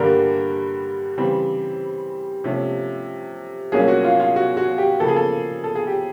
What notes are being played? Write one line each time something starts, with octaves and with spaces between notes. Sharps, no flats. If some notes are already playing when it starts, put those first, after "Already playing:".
Already playing: G2 D3 G3 A#3 A#4
C#3 E3 G3 C4
C3 F3 A3 C#4
C2 A#2 F#3 A#3 C#4 G#4
F#4
F4
F4
F#4
F#4
G4
C#3 F3 A#3 A4
G#4
A4
A4
G#4
G4